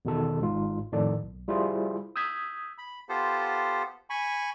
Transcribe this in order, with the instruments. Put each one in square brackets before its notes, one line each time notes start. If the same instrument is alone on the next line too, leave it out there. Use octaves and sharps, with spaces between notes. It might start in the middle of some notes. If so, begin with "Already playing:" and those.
[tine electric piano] E2 B2 D#3 A4
G#1 G#2 F4
F2 A2 D#3 A4 D5
B1
G3 E4 F4 G#4 C5
D#6 E6 G6 G#6 B6
[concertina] B5
B3 F4 G4 A4 C5
G#5 B5 C#6